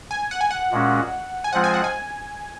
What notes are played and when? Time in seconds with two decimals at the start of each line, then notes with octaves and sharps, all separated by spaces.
0.11 G#5
0.31 F#5
0.41 G#5
0.51 F#5
0.71 A#2 G#3 C#4 F#4
1.44 G#5
1.53 F3 G#3 C4 F4 C5 F#5
1.64 G#5
1.74 F#5
1.84 G#5